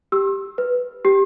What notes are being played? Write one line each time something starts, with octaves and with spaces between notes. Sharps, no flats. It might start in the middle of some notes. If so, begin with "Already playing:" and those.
G4 E6
B4
G4